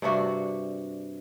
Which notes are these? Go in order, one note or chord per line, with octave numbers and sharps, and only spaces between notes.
G2 C3 D4 F#4